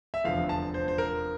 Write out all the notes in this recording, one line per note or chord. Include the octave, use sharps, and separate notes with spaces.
E5
F1 E2 D3 F3 F5
A5
C5
C5
A#4